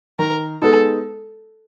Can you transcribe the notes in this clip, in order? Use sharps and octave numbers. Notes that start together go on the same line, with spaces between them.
D#3 A#4
G#3 B3 D#4 A4